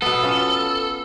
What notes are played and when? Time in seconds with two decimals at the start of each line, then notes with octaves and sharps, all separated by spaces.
0.02 B2 B3 A4
0.23 B3 C#4 F4